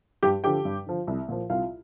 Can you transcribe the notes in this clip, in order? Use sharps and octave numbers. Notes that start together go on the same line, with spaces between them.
G2 G4 G5
D3 F3 G4 G5
G2
D3 F3
C2
A#2 F3
C2 F4 F5